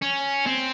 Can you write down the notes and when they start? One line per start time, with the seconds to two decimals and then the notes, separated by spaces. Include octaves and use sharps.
0.02 C#4
0.46 C4